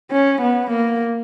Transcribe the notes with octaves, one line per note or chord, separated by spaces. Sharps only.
C#4
B3
A#3